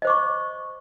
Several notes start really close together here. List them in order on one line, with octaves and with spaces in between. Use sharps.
D#5 C5 D6 C#6